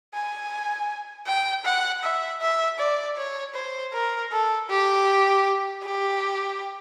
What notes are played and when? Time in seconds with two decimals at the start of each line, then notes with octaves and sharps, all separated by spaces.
0.14 G#5
1.27 G5
1.65 F#5
2.03 E5
2.41 E5
2.78 D5
3.17 C#5
3.54 C5
3.93 A#4
4.31 A4
4.69 G4
5.83 G4